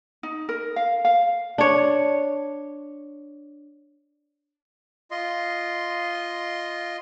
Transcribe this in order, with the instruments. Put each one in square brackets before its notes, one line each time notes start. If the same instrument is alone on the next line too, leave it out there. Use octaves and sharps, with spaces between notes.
[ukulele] D#4
A#4
F5
F5
[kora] D4 C#5
[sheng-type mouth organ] F4 D#5 C6